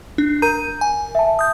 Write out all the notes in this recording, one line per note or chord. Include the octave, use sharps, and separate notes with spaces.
D4
A#4 A#5 G6 D#7
G#5
E5 A5
D#6 G6